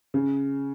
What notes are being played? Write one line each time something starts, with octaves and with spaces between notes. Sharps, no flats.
C#3